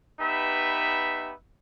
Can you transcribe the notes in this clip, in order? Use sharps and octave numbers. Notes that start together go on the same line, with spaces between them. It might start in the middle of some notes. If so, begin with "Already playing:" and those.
B3 D#4 G4 B4 E5